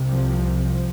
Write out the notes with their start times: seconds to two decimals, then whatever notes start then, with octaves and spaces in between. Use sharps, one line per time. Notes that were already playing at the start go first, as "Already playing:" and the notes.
Already playing: C2 C3
0.12 F3
0.56 F3